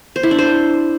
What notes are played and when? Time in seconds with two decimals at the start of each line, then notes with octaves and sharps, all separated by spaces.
0.16 C5
0.23 E4
0.31 D4
0.39 C5